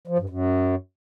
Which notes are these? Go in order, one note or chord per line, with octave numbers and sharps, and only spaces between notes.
F3
G2
F#2